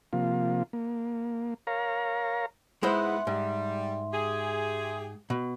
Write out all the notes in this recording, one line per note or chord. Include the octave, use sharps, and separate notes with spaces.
C3 F3 A#3 F4
A#3
A#4 C#5 F5 A#5
G#2 G#3 B3 E4 C5 E5 F#5 C6
G#2 G3
G4 G#4
B2